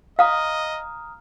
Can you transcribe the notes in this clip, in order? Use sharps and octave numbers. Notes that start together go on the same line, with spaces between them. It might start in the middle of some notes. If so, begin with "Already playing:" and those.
D#5 F5 A#5 D#6 F6